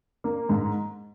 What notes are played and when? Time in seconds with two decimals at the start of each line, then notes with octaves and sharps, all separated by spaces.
0.24 A#3
0.49 G#2